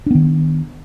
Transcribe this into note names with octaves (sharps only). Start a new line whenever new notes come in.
D#3 B3 D4